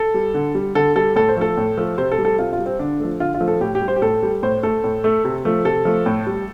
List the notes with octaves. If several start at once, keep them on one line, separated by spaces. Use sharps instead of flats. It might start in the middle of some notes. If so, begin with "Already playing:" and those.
Already playing: A4
G3
D3
G3
D3 A4
G3 A4
A2 A4
C5
F3 A3 A4
A2
F3 A3
C3 C5
A4
G3
A4
C3 F4
F4
G3
C4
D3 D4
F3 A3
D3 F4
F4
F3 A3
A4
A2 G4
G4
G3
C5
G4
A2 A4
G3
A2 C5
A3 A4
A2
A3
C3
F3 A3
C3 A4
F3 A3
A2
G3